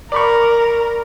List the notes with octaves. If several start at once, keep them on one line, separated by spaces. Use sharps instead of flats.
A#4 D5 B5 C#6